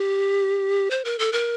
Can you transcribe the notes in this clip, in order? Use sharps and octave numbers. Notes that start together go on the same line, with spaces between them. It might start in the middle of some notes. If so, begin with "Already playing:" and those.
Already playing: G4
C5
A#4
A4
A#4